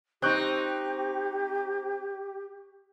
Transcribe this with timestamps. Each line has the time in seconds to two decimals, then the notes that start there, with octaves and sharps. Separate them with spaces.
0.22 C4 D#4 G4 C#6 F#6 G6